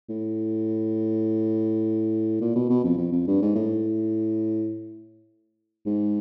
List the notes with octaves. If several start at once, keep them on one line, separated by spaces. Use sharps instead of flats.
A2
A#2
B2
B2
F2
F2
F2
G2
G#2
A2
G#2